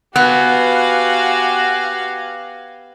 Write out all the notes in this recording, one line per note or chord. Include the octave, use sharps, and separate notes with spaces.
B3 F#4 G4 B4 F5 G#5 F#6